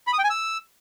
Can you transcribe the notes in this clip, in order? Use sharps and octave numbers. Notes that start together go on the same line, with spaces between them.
B5
D#6
G5
G#5
E6